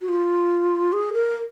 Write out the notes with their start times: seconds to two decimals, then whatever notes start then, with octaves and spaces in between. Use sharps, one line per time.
0.01 F#4
0.09 F4
0.93 G#4
1.13 A#4